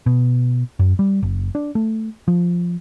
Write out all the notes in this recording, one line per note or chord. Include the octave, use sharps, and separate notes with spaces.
B2
F#2
G3
F#1
D4
A3
F3